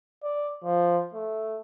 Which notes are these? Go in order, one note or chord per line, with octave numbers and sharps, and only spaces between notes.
D5
F3
A3